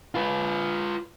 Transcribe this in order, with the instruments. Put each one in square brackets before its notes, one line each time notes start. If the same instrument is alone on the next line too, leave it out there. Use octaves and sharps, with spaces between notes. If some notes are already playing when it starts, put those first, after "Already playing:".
[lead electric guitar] F4 B4